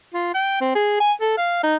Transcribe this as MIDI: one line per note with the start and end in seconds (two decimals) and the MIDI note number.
0.14 0.31 65
0.34 0.59 79
0.61 0.73 60
0.75 0.96 68
1.00 1.13 80
1.21 1.37 69
1.38 1.58 77
1.63 1.76 63